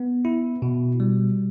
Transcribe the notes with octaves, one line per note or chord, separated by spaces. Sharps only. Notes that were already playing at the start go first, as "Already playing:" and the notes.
Already playing: B3
E4
B2
G3